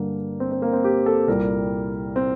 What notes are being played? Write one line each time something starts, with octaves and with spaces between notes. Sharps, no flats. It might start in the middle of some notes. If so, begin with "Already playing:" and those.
Already playing: G2 D3 G3 A#3
C4
C4
A#3
C4
G4
A4
C2 A#2 G3 A#4
C4